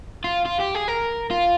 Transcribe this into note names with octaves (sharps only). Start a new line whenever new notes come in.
F4
F4
G4
G#4
A#4
F4